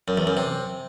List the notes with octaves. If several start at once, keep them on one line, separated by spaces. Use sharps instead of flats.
F#2
E2
F#2
C3